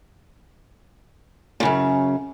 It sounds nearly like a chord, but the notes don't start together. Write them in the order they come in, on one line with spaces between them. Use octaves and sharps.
A#2 C#3 F#2